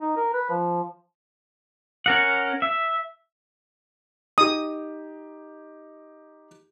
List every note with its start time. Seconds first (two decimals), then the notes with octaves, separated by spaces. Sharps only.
0.01 D#4
0.17 A#4
0.34 B4
0.50 F3
2.06 C#4 A#4 F#5
2.62 E5
4.38 D#4 G4 D#6